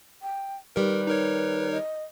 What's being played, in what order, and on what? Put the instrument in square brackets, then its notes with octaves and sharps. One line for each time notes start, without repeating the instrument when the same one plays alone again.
[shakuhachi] G5
[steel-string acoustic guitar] D#3 G3 [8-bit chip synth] A#4 [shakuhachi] B4
[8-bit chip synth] D#4 A#4 C#5
[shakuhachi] D#5